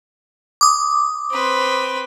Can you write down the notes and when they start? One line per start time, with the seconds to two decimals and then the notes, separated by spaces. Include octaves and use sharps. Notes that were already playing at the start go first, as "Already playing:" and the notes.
0.61 D6 D#6
1.31 C4 B4